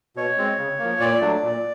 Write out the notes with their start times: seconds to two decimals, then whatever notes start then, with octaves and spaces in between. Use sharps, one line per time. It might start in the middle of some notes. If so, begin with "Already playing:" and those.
0.16 B2 C#5
0.38 G#3 C4
0.58 C#3
0.79 F3 A#3
1.00 A#2 D5
1.21 F#3 A3 D4
1.43 A#2